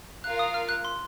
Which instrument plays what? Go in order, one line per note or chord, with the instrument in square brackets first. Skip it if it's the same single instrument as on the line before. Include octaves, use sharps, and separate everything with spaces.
[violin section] F4 A#4 F5 [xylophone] F#6
[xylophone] D#6
F6
F#6
C6